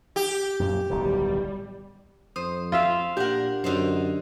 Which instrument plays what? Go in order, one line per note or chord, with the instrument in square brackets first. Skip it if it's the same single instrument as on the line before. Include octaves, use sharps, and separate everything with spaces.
[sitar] G4
[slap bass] F#2 A#2
[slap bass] D1 B1 D#3 [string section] G3
[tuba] F2 [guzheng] C5 [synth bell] D#6
[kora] F4 E5 F5
[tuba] A#2 [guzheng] D4 A#4 [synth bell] G4 F#5
[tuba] F#2 [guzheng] D3 D#4 C5